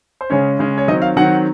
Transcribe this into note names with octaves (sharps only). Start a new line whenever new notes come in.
C5
C#3 G#3 C#4 C#5
C#3 G#3 C#4
C#5
D#3 F#3 C4 D#5
F5
D#3 F#3 C4 F#5